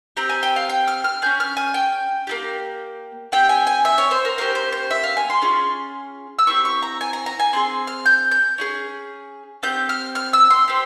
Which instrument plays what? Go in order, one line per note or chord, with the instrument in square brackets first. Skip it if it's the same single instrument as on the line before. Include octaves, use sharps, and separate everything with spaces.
[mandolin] C4 G4 A#5
G#5
G5
F5
G5
F6
F6
C#4 F4 G#4 G6
F6
G#5
G5
A#3 E4 G4
C4 G4 G5
G#5
G#5
E5
C#5
C5
A#4
A#3 C#4 G4 C5
C5
C5
E5
F5
G#5
C6
C#4 F4 G#4
E6
C4 E4 G4 C#6
C#6
A#5
G#5
A#5
A#5
G#5
C4 E4 G#4 C6
F6
G6
G6
C#4 E4 G#4
C4 G4 G6
F6
F6
E6
C6
C4 G4